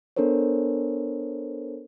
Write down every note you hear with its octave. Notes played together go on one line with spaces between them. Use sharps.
B3 D4 A4 A#4 C5 C#5